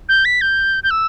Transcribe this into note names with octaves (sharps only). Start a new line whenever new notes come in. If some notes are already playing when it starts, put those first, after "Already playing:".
G6
B6
G6
G6
E6